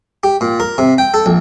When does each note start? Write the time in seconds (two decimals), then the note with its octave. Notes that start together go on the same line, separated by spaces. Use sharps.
0.23 G4
0.41 A#2
0.60 A#4
0.78 C3
0.98 G5
1.14 A4
1.26 A#1